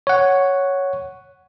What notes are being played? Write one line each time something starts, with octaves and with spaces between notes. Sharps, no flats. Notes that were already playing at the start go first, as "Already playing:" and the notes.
C#5 F#5